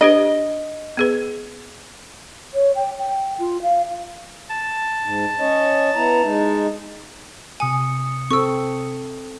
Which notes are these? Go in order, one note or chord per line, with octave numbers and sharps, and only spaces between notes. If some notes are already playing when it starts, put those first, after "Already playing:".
D4 G4 B4 D#5
B3 G#4 B4
C#5
G5
G5
F4
F5
A5
G#2
C#4 C#5 D#5
B3 E4 A#5
G#3 D#4
C3 G#5 D#6 C#7
C4 A4 C#6 E6